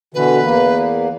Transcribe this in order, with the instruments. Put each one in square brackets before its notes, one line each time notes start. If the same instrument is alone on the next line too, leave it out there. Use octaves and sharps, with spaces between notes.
[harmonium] B2 D3 E3 [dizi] B4
[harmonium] E2 A#3